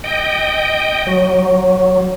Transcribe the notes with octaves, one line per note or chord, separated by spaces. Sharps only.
D#5 G5
F#3